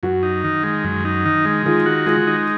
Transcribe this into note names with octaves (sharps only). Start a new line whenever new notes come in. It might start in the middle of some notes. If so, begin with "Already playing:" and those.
F#2 F#4
D#4
D#3
G#3
F#2
D#4
D#3
G#3
D#3 F4 G#4
F#4
G#3 F4 G#4
D#4